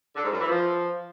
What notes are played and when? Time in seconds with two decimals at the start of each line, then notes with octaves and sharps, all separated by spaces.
0.16 D3
0.24 G#2
0.33 F#2
0.41 E3
0.49 F3